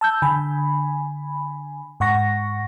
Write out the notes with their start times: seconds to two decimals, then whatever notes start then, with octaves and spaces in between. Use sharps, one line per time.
0.01 A5 E6 G6
0.22 D3 G#5 B5
2.00 G#2 F#5 C#6 A#6